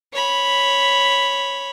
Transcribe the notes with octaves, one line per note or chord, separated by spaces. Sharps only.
C#5 B5